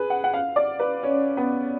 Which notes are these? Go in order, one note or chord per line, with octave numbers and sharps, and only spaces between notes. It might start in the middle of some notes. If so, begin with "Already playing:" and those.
Already playing: G#4 B4
F#5
F#5
F5
D5
B4
C#4
B3